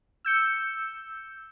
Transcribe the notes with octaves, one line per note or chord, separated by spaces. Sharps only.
E6 G6 C#7